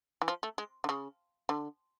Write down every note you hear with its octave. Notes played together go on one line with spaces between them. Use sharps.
E3
F3
A3
G#3
D3
C#3
D3